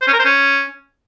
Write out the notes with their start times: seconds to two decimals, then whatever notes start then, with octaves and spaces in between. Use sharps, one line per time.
0.02 C5
0.07 C#4
0.13 A#4
0.19 C5
0.25 C#4